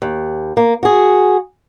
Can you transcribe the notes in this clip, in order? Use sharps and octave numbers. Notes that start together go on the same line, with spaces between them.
D#2
A#3
F#4 G#4